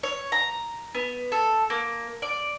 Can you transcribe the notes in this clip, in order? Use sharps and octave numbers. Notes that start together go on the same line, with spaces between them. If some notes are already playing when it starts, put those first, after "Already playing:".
C#5
A#5
B3
A4
A#3
D5